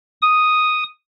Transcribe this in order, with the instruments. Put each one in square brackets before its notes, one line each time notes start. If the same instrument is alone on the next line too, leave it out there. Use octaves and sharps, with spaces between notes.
[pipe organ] D#6